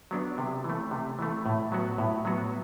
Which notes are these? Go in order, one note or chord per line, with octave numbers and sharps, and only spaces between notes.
F#3 B3 D4
C3
E3
A3
C3
E3 A3
A2
F#3 B3 F#4
A2
F#3 B3 F#4